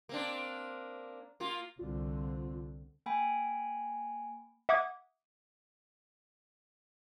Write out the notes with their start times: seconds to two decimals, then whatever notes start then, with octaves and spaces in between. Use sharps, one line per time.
0.09 A#3 C4 D4
1.40 A#3 F4
1.79 C2 D3 C4 F4
3.06 A#3 G5 G#5 B5
4.69 E5 F#5 D6 D#6 G#6